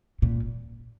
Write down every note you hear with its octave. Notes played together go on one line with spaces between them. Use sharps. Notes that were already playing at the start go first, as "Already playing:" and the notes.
A#2